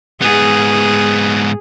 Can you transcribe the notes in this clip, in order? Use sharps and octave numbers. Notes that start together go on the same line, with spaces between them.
G#2 B3 G#4